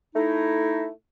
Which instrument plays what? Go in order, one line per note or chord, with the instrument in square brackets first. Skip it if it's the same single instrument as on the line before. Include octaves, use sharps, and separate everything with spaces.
[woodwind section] A3 D#4 E4